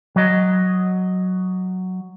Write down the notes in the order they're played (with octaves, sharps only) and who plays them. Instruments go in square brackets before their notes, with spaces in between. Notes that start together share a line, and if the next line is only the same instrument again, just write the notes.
[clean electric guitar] F#3 D#5